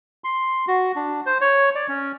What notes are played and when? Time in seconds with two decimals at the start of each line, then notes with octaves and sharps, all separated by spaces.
0.24 C6
0.68 F#4
0.96 D4
1.26 C5
1.41 C#5
1.75 D5
1.89 C#4